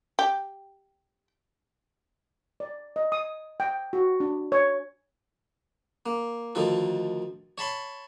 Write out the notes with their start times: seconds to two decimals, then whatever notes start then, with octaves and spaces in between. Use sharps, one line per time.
0.19 G4
2.60 D5
2.96 D#5
3.12 D#6
3.60 G5
3.93 F#4
4.20 D4
4.52 C#5
6.06 A#3
6.55 D2 D#3 F3 A4
7.58 C#5 A5 B5 C6